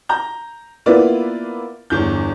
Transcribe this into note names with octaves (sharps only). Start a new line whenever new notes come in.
A#5 G6
A#3 B3 E4 F4 B4 D5
G1 E2 G6